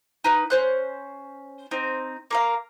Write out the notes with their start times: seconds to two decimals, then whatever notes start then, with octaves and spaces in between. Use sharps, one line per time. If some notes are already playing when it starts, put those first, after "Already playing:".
0.24 D#4 B4
0.50 C#4 C5 F#6
1.71 C4 D#4
2.31 A#3 A#4 F5